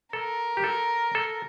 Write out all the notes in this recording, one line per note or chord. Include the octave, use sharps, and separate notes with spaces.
A4 A#4
G4
A4
A4